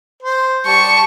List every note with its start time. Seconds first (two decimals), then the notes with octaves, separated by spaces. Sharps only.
0.23 C5
0.67 G3 A5 C#6